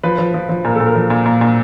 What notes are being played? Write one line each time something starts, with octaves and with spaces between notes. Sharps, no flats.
F3 B4
F3
F3
F3
A#2 A#4
A#2 A4
A#4
F3
A#2
A#2
A#2